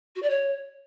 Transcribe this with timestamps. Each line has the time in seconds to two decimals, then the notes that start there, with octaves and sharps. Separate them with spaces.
0.15 F#4
0.22 D5
0.29 C#5